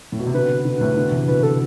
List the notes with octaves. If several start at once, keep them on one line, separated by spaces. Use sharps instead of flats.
A2
B2
C3
B2 D3 B4
B2 D3
A2 C3
B2 D3
C3 E3
B2 D3 B4
A4